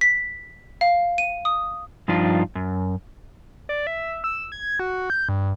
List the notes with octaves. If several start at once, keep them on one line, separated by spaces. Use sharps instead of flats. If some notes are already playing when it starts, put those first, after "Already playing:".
B6
F5
D#7
D#6
G2 F3 D4 D#4 F4
F#2
D5
E5
E6
G#6
F#4
G6
G2